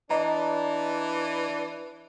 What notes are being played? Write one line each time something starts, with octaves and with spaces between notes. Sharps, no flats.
E3 D4 D5 D#5 A#5